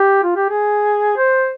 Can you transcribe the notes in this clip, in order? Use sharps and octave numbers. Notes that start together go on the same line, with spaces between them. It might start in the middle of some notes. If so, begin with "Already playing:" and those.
Already playing: G4
F4
G4
G#4
C5